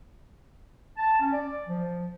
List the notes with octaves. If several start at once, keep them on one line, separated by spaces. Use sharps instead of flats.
A5
C#4
D5
F3